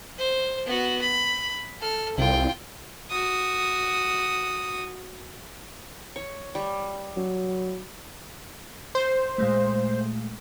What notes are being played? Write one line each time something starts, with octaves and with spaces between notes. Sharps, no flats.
C5
B3 F#4
B5
A4 F6
C2 F4 G5
F#4 D#6
C#5
G3
F#3
C5
A#2 G#3 A3